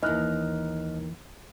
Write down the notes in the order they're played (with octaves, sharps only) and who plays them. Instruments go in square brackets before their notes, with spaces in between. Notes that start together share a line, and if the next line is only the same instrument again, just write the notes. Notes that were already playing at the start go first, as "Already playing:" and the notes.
[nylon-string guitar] D#2 D#4 [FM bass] E3 [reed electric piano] D#5 F6 F#6